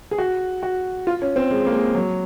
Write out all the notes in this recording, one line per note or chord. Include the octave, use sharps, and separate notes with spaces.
G#4
F#4
F#4
F4
C#4
C4
G#3
A#3
G#3
F#3